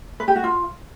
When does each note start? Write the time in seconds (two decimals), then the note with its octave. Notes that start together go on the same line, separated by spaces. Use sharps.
0.20 B4
0.28 G4
0.36 F#4
0.44 F4